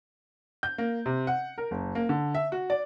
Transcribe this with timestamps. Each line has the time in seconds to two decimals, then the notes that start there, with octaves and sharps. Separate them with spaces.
0.63 G6
0.78 A#3
1.06 C3
1.27 F#5
1.58 A#4
1.71 F#1
1.95 A#3
2.09 D3
2.35 E5
2.52 F#4
2.70 D5